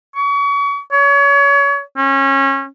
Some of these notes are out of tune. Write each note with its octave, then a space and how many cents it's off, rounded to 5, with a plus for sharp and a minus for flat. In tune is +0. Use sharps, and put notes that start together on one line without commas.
C#6 +35
C#5 +30
C#4 -25